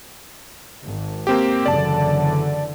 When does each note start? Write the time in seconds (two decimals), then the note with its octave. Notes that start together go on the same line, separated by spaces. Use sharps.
0.85 G#1
1.27 A#3 C4 G4
1.66 F#1 D3 E3 D5 A5